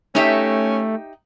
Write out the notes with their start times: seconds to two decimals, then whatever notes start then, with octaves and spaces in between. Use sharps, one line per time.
0.15 A3 C#4 D#4 G4 E5